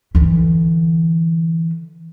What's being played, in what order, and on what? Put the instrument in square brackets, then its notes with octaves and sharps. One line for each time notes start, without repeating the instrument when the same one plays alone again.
[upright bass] D3 E3